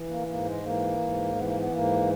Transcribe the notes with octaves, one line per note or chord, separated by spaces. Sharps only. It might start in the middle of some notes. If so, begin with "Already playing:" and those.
Already playing: E3
A#3
G#2 A#3
G#3
E3 A#3
G#2
E3 B3
A#3
B3
G#2 A#3